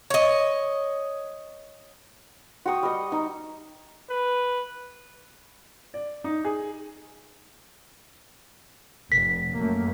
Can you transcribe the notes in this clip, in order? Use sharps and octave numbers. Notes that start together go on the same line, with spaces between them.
C#5 D#5
F#4 G5 C#6 D#6
G3 D#5
D#4
B4
D5
D#4
G#4
F1 B6
F#2 A3 A#3